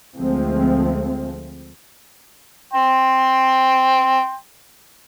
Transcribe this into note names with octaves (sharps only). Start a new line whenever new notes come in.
D2 F3 G#3 A3 C4
G5 C6